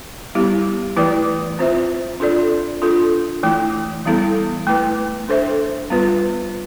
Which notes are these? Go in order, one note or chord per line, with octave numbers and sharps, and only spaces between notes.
G3 B3 E4 G4
E3 A3 E4 B4 D5
C4 F4 C5 E5
D4 F4 A4 D5
D4 F4 A4
E3 A3 E4
E3 G3 B3 E4 A4
A3 E4 B4
D4 A4 C5 E5
G3 B3 F4 B4